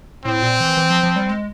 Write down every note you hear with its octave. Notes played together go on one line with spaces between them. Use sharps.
A2 C4
A#2
E3
E3
F3
F3
G3
G#3